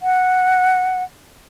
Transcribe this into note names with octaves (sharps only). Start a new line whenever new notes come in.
F#5